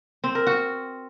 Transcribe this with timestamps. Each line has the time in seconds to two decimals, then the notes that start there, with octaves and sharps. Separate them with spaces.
0.24 C4
0.35 A#4
0.47 F#4